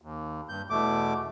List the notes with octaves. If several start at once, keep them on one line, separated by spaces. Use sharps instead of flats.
D#2
G2 G6
E2 B2 A3 D6